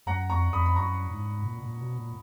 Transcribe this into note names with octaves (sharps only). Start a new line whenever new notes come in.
F#2 F#5 A#5
F2 A#5 C#6
F2 B5 D#6
B5
F#2 A#5 C#6
G#2
A#2
A#2
B2
A#2